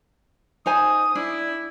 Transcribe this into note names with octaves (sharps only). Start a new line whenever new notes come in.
D#4 C5 G#5 D#6
D4 E4